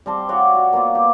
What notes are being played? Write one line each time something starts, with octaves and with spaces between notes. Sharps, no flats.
G3 C4 A5 C6
F4 F#4 C#5 D5
F#4
A#3 B3 F4 C5
G4